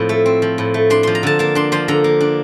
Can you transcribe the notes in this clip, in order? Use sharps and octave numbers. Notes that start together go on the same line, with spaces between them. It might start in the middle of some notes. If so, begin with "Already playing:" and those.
Already playing: A2 F3 C4
A3
C4
F3
A2
A3
D4 C6
F3 C6
A#5
D3 A5
A#3 A5
D4 C6
F3 C6
D3 A#5
A#3
D4